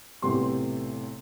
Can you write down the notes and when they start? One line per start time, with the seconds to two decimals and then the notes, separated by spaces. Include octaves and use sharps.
0.22 B1 A2 C3 B3 G4 C6